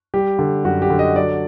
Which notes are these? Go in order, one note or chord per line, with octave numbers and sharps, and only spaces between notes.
G3 G4
D3
F#2 F#4
G4
D3
D#5
F#3 D5